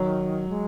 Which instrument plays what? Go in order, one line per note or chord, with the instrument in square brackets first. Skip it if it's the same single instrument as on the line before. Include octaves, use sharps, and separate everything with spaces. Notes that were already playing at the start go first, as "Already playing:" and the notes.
Already playing: [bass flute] D#3 [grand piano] F#3
[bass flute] G#3